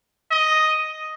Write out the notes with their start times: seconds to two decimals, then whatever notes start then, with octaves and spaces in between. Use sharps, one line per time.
0.31 D#5